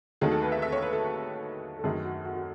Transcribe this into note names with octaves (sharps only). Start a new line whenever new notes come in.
D#2 D#3 F#3 A3 G#4
A4
B4
E5
E5
C#5
B4
A4
A4
F#2 D#3 F#3 A3 G#4
F#4
F#4
F#4